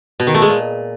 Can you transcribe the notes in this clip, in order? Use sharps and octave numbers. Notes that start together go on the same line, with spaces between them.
B2
D#3
A3
G#3
A#2